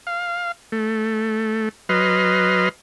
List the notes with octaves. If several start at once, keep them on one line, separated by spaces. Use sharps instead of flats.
F5
A3
F#3 B4 D#5 C6 F6